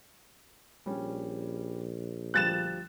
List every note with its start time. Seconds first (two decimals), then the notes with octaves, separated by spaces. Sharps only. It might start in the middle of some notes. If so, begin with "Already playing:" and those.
0.86 A#1 G3 C#4
2.34 D2 F3 G3 F#6 A6 E7